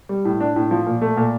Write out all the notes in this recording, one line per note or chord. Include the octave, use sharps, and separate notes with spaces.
G3
A2
D4
A2
F3
A#2
A3
A#2